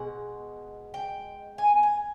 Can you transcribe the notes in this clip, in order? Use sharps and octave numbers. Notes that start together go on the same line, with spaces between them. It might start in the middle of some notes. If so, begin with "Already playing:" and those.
Already playing: B2 G#3 F#5
G5
G#5
G#5